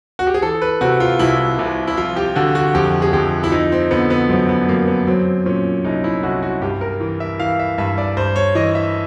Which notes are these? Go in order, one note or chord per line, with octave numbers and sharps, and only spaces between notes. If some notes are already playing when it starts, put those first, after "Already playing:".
F#4
G4
G#4
E3 A4
B4
C3 F#4
F4
C2 E4
C2
E4
F3 F4
G4
D3 F#4
F#4
F2 G4
G#4
F2 G4
E4
F3 D#4
C4
D3 B3
B3
F#2 C4
B3
F#2 A#3
B3
F#3 C4
A#2 C#4
C2 D#4
E4
C2 F#4
F#4
G2 G4
A#4
E3
E5
E3 F5
E5
G2 E5
D5
G2 C5
C#5
E3 D#5
E5